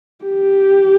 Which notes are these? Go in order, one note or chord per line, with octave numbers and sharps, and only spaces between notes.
G4